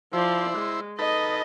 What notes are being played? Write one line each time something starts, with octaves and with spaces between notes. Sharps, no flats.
F3 E4 C5 D5
G#3
D#4 A4 B4 D#5